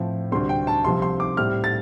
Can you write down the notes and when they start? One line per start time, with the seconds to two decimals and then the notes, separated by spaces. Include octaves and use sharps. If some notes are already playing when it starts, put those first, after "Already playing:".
Already playing: A2 F3 C4
0.32 D2 C3 G3 C4 C6
0.49 G5
0.67 A5
0.85 C2 C3 F3 C4 C6
1.02 C6
1.20 D6
1.37 A2 G3 C4 F6
1.64 A6